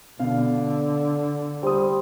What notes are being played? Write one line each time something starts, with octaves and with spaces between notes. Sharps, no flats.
B2 D3 F5
G3 C5 D#6